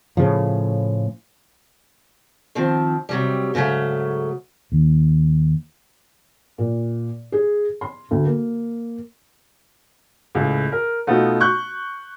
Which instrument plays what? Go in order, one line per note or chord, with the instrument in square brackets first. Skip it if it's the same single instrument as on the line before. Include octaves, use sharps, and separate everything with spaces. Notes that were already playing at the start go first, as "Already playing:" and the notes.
[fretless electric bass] A2 C#3 F3
[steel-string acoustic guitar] D#3 F3 C4
C3 F#3 G3
G#2 C#3 E3 F#3 A3
[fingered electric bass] D#2
[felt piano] A#2
G#4
C6
D2
A#3
[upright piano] C#2 A2
A#4
B2 A3 B3 D#4 F4
C#6 F#6 G6